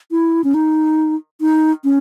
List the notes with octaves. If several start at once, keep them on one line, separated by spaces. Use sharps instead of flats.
E4
C#4
D#4
D#4
C#4